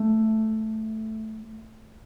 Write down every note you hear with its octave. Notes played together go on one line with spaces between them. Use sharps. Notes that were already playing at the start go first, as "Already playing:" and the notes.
Already playing: A3